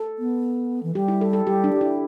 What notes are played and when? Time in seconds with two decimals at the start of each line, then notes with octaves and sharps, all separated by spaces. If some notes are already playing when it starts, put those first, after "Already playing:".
Already playing: A4
0.19 B3
0.83 E3
0.95 G3 G4
1.08 E4
1.21 A4
1.33 A4
1.47 G3 G4
1.64 D4
1.73 G4
1.81 E4